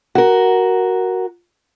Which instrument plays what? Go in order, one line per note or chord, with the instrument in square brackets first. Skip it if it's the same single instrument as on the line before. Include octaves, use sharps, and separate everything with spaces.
[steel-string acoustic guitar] F#4 A#4